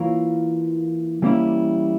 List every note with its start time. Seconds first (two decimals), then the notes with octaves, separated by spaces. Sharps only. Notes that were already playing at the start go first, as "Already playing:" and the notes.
Already playing: E3 A#3 F4 A#4 C#5
1.22 E3 G3 A#3 C#4 E4